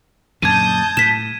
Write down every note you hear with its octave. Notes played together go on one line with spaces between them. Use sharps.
F#2 A#2 D3 A5 D#6 G6 G#6 D#7
A2 B6 E7